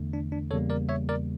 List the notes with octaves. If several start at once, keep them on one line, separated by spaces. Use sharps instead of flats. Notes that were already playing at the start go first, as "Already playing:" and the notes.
Already playing: E2 D3 A3
D4
D4
E2 C#3 G3 A#3 A4 C#5
A#4 D5
C#5 E5
A#4 D5